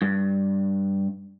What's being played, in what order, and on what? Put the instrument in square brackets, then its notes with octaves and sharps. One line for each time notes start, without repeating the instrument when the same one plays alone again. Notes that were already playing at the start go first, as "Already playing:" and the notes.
[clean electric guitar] G2